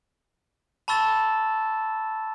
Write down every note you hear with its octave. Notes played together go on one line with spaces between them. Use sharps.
A5 B5 C#6 E6 A6 E7